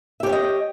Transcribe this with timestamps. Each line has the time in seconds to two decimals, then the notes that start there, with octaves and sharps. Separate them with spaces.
0.20 E5
0.23 G4
0.26 C#5
0.29 G5
0.32 D#5